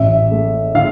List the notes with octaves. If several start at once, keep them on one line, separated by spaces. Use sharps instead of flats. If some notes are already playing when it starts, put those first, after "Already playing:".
Already playing: A1 E5
A3
D3 F5